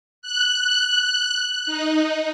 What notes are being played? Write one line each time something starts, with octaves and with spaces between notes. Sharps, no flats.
F#6
D#4